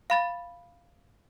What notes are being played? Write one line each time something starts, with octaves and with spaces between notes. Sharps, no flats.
F5 B5 A6